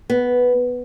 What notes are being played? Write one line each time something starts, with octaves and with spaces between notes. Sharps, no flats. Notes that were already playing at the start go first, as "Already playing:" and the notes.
B3